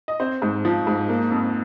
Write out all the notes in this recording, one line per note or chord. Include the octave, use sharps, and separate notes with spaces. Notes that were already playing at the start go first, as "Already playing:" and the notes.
D#5
C4 C5
G#2
F3
G#2
A#3
F2